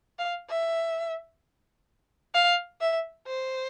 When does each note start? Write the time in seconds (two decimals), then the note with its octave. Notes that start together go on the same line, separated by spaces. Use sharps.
0.19 F5
0.49 E5
2.34 F5
2.81 E5
3.27 C5